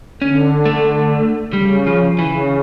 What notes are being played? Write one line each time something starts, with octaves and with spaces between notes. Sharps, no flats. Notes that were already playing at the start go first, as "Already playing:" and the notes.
D3 C#4
A3
C#3 G3
F3
C#3 E3